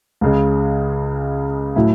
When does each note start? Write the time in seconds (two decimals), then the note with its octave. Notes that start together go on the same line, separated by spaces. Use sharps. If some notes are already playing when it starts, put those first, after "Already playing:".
0.21 C#2 C#3 G#3
1.76 A2 F#3 A3 E4